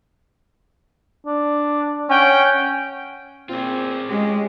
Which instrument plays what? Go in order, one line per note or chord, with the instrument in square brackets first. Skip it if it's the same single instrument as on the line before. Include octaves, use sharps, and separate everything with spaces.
[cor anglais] D4
[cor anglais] C#4 [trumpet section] F#5 G5
[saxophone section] A#2 C4 [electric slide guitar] F4 G#4
[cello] G#3 [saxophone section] C#4 G4